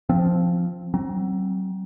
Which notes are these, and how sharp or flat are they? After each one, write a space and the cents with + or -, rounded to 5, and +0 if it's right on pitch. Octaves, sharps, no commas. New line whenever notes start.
F3 +0 C4 +0
F#3 +40 C4 +20